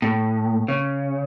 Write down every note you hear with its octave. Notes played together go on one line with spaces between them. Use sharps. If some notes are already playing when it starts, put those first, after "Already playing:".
A2
C#3